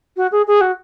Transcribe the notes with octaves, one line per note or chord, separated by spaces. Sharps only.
F#4
G#4
G#4
F#4